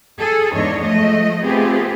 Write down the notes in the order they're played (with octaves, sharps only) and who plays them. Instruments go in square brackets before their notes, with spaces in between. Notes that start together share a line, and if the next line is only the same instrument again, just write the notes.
[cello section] G#4 A4
E2 G#2 D4 C#5 D#5
F3 G#3 A3 D#5
A3 B3 C4 F4 G4 G#4